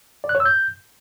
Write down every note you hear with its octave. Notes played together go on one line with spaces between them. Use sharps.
D5
F#6
C#5
E6
G6